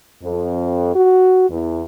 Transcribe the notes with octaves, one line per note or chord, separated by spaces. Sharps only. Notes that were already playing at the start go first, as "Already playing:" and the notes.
F2
F#4
E2